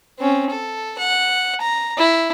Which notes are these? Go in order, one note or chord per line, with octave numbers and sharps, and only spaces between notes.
C4 C#4
A4
F#5
A#5
E4